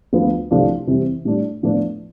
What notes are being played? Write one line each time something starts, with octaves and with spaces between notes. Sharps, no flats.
D2 D3 F3 B3 F4
C2 C3 F3 A3 D4
C3 E3 G3 C4
A2 G3 D4
A2 F3 B3 D4